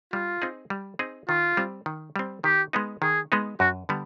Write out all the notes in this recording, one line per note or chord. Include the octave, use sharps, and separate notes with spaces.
G3 F4
C4 D#4 G#4
G3
C4 D#4 G#4
D#3 F4
G3 C4
D#3
G3 C4
D#3 G4
G#3 B3 D#4
D#3 G#4
G#3 B3 D#4
F#2 F#4
D3 G3 B3